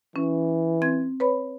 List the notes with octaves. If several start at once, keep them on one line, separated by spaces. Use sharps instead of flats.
E3 C#4
C4 G#6
B4 C#5 B5